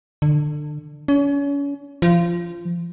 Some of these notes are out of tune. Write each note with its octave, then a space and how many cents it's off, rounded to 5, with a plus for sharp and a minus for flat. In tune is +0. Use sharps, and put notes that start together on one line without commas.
D3 +25
C#4 +35
F3 -20